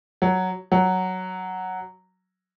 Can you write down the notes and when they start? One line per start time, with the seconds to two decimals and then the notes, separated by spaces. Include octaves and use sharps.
0.22 F#3
0.72 F#3